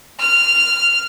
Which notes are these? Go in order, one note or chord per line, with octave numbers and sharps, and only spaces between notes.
F6